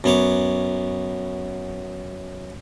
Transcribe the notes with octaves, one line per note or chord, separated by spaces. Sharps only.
F#2 B3 C#5 D6